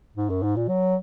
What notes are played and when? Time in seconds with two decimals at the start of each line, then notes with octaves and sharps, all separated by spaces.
0.17 G#2
0.30 F#2
0.43 G#2
0.56 A#2
0.69 F#3